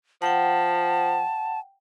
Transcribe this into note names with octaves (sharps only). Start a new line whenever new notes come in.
F3 F#5 G5 A5